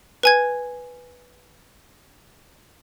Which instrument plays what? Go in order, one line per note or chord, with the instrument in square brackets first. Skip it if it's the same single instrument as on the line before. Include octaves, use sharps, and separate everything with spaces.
[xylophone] B4 G#5 G#6